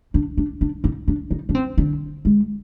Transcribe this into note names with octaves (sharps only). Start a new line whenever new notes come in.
D4
D4
D4
D#4
D4
D#4
D4
C4
D3
G#3